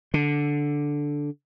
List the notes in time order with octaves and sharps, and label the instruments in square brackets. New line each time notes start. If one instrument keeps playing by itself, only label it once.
[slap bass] D3